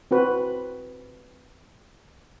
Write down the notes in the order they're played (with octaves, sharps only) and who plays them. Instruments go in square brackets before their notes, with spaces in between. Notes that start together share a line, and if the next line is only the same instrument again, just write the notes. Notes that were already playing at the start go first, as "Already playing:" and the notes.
[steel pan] C4 F#4 B4